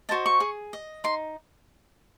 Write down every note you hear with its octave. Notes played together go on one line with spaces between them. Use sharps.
F#4 C5 D#5 A5
C#6
G#4
D#5
D#4 C6